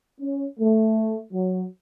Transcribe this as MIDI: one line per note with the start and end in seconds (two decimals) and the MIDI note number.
0.20 0.45 61
0.59 1.19 57
1.33 1.64 54